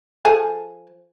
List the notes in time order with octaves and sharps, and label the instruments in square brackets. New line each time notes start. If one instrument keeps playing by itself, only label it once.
[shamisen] F3 G#4 A4